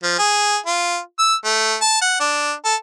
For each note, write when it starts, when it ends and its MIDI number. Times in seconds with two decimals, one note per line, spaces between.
0.03 0.14 53
0.19 0.57 68
0.66 0.99 65
1.19 1.35 88
1.45 1.76 57
1.82 2.00 81
2.02 2.19 78
2.20 2.53 62
2.65 2.75 69